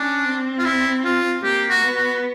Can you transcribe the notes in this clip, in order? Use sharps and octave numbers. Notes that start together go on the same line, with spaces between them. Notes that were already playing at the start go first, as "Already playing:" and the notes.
Already playing: C#4 D4
C4
F4
E4
F4
A#3 G4
F#4
B3
F#4